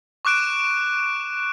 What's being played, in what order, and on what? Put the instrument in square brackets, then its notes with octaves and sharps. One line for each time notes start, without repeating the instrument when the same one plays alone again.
[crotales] C#6 D6 F#6 D7 E7